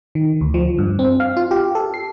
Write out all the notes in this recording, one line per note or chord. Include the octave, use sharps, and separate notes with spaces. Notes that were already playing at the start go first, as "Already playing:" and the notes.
D#3
D2
F3
G2
C4
F5
F4
G4
A4
C7